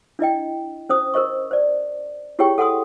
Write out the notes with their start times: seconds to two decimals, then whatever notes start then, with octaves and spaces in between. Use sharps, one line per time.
0.19 D4 E4 D#5 G5
0.89 C#4 C5 D#6
1.14 A#4 C5 D#5 C#6
1.51 C5 D5
2.39 E4 G4 G#4 C#5 G5 C#6
2.58 A4 F#5 G#5 C6 D#6